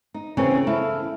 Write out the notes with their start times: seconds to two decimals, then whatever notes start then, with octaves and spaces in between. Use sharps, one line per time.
0.14 D#4
0.37 C#3 E3 A#3 C4 C#4
0.67 E4 A4 F5